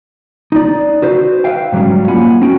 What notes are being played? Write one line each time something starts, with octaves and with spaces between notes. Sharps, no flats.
D#4 D5
F#4 B4 C5
B4 C5 D5 E5 F5 G5
G#2 F#3 G3 C#4
A#3 F4 F#5 G#5 B5
C4 C#4 F#4 G5